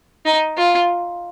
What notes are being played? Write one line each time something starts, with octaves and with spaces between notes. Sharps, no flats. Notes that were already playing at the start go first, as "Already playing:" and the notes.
D#4
F4